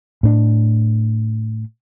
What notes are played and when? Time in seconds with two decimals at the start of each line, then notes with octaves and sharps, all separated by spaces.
0.23 A2 D4